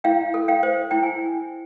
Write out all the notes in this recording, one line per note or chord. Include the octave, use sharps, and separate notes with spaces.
E4 F5 G5
A4
F5 G5
C5
E4 G5
G#5